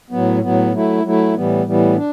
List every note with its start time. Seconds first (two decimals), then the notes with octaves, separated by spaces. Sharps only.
0.10 A2 F#3 B3
0.42 A2 F#3 B3
0.73 F#3 A3 E4
1.03 F#3 A3 E4
1.35 A2 E3 G3 B3
1.65 A2 E3 G3 B3
1.96 D4